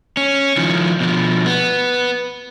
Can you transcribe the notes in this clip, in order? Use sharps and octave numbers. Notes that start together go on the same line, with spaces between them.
C#4
D#3 F3
B2 F3
B3